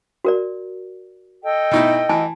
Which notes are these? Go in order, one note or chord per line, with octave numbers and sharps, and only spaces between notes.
F#4 A#4 D5
A4 D#5 G5
B2 D#4 E4
E3 G#5 A5